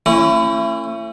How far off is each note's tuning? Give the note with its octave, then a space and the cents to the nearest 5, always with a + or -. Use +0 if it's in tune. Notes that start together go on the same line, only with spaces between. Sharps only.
A3 +35 C#4 -25 E4 +30